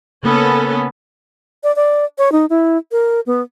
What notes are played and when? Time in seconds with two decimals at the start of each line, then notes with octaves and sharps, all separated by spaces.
0.23 C#3 A#3 B3 C#4 A4
1.64 D5
1.76 D5
2.18 C#5
2.32 D#4
2.50 E4
2.92 A#4
3.26 B3